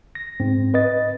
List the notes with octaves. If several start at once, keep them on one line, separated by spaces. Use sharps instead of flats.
A#6
G#2 C4
B4 D#5 A6